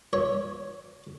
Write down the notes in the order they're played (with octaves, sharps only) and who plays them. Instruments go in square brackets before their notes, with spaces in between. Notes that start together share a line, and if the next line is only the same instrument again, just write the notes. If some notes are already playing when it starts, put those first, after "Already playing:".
[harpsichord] C#5